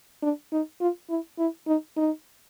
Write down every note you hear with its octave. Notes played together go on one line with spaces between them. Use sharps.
D4
D#4
F4
E4
E4
D#4
D#4